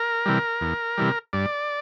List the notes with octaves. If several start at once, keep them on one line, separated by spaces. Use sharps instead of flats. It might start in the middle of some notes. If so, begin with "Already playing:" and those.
Already playing: A#4
C3 E3 G3
E2
C3 E3 G3
G2 D5